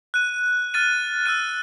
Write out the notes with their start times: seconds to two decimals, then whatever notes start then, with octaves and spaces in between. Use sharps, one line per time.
0.14 F#6 D#7
0.74 F6 A6 D#7
1.26 E6 F#6 D#7